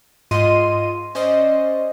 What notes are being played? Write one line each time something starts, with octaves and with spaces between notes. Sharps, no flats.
G#2 F4 D#5 C6 D#7
C#4 C5 D5 D#5